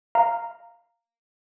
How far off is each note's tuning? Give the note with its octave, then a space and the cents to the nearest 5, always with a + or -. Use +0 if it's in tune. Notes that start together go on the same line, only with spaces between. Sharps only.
F5 +0 A#5 -5